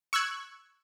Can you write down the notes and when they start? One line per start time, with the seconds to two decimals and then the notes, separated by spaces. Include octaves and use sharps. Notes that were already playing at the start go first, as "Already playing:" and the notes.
0.13 C#6 E6 F#6 G#6